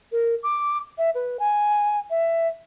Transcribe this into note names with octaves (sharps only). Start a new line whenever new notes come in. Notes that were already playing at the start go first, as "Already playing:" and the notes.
A#4
D6
E5
B4
G#5
E5